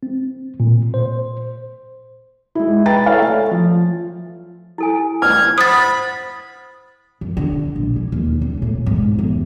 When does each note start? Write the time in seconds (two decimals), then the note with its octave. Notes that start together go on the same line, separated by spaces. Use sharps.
0.03 C4
0.60 A#2
0.94 C5
2.55 G#3 E4
2.86 B4 G5 A#5 B5 A6
3.06 E4 A4 C#5 D5 E5 F5
3.22 A3
3.51 F3
4.78 E4 A4 G#5
5.22 F6 G#6
5.58 C5 F#5 B5 D#6 A6
7.21 F#2
7.37 D3
7.76 A#1
7.96 E4
8.12 D#2
8.41 C#2
8.62 A2
8.86 G#2
9.19 E2